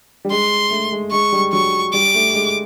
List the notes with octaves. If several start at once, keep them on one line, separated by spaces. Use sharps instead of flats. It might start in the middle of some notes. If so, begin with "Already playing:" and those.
G3
G#3 C6
A3
G#3
G#3 C#6
G3
F#3 C#6
G3 D6
A3
G#3